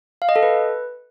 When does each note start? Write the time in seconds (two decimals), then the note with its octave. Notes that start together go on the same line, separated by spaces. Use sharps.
0.22 F5
0.29 D#5
0.36 A4
0.43 B4